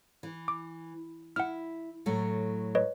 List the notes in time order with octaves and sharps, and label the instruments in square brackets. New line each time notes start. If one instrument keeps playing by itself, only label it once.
[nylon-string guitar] E3
[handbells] D6
[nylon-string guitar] E4 [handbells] F#5 F6
[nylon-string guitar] A2 F#3 A3
[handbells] B4 C#5 D#5